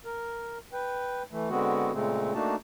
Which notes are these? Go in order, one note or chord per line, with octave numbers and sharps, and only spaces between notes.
A#4
B4 G5
E3 A3
D3 G#3 B3 C4 F#4
A#2 C#3 G#3 A3 C4
A3 A#3 D4 D#4 F#4 A5